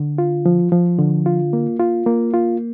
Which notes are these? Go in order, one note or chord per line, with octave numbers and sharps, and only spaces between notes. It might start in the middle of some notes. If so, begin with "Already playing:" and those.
Already playing: D3
F4
F3
F3
D3
F4
A#3
F4
A#3
F4